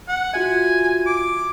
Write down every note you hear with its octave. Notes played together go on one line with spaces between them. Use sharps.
F#5
F4 F#4 E5 G#5
D6